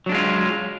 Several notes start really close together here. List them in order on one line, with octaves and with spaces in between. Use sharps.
F#3 D4 G#3 F4